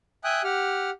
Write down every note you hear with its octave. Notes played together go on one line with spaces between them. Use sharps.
E5 G5 G#5 D#6 F#6
G4 F#5 F6